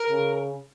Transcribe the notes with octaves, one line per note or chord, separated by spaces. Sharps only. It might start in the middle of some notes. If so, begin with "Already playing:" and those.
Already playing: A#4
C#3